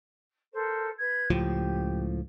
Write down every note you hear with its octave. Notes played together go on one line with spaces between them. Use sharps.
A4 A#4 C5
B4 G#6
C#2 A2 F3 G4